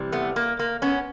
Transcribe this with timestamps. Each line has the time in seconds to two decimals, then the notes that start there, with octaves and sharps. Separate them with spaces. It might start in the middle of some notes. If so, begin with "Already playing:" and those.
Already playing: C3 E3 G3
0.12 A3 B3
0.36 A#3
0.59 A#3
0.82 B3 C#4